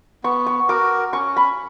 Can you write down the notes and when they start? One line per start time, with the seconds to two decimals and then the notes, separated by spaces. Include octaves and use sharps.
0.24 B3 C#6
0.47 C#6
0.69 F#4 A#4 D6
1.13 C#4 C#6
1.37 B5